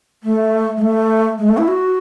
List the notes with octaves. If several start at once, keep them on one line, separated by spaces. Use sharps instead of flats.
A3
G#3
A3
G#3
A3
E4
F#4